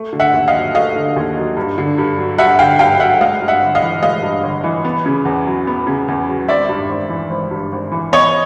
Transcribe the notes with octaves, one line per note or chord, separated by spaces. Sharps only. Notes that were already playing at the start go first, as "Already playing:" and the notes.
Already playing: A3
D3
E5 F#5
D#2
D#5 F5
F#3
A3 D#5 F5
D3
D#2
F#3
G2
D3
G2
F#3
G2 E5 F#5
D3 F5 G5
G2 F5 G5
F#3 E5 F#5
G#3 D#5 F5
G2
E5 F#5
G1
D#5 F5
E3
G#3 D#5 F5
G2
G1
E3
B3
C#3
E2
F#3
B3
C#3
E2
F#3
G#1 D5 E5
G2
G#1
E3
G#1
G2
G#1
E3
B3 C#5 D#5